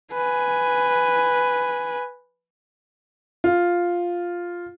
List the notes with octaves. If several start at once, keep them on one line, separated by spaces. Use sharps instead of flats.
B4 G#5
F4